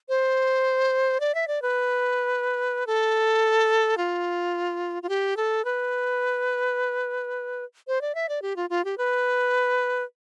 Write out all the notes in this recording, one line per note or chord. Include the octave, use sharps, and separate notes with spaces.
C5
D5
E5
D5
B4
A4
F4
F4
G4
A4
B4
C5
D5
E5
D5
G4
F4
F4
G4
B4